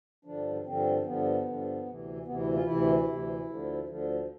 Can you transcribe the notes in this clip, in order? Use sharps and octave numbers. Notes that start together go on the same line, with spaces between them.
G2 D3 F3 D4
G2 D3 F3 C4
G2 D3 F3 B3
G2 D3 F3
D2 C3 E3
D2 C3 E3 B3
E4
F4
D2 C3 E3 E4
D2 C3 E3
D2 D3 F3
D2 D3 F3